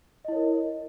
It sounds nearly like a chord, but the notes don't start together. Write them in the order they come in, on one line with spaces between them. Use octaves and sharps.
D#5 E4 C#5 A#4